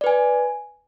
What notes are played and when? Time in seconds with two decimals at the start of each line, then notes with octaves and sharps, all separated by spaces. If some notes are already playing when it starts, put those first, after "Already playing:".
0.01 D5
0.04 B4
0.07 G#5